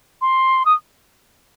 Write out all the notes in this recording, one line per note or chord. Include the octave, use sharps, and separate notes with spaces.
C6
D#6